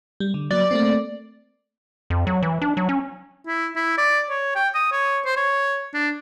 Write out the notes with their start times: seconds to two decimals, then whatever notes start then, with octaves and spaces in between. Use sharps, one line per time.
0.20 G3
0.34 D3
0.51 F#3 A#3 D5
0.71 A3 A#3 C4
2.10 F2
2.27 F#3
2.43 E3
2.62 D4
2.77 F#3
2.89 C#4
3.47 E4
3.76 E4
3.98 D5
4.30 C#5
4.56 G5
4.75 D#6
4.92 C#5
5.25 C5
5.37 C#5
5.93 D4